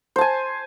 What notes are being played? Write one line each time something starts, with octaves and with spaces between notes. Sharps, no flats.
C5 G#5 A5